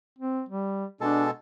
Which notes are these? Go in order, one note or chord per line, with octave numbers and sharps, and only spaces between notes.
C4
G3
B2 G#3 D4 A4